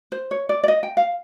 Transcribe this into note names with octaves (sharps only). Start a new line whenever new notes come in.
C5
C#5
D5
D5
D#5
G5
F5